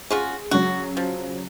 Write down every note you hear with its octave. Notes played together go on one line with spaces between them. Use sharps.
C#4 F4 F#4 G#4
C#3 F#3 F#4
F3